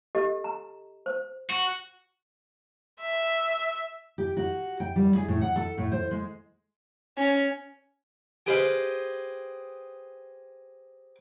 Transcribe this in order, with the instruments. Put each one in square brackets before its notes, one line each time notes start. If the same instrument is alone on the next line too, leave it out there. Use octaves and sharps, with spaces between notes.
[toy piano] G4 A4 D#5
A#5
C5
[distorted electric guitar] F#4
[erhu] E5
[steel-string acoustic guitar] G4
F#4
G5
G3
G#4
A2
F#5
A4
A2
C5
G#3
[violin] C#4
[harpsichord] G4 G#4 B4 C5 D#5 F5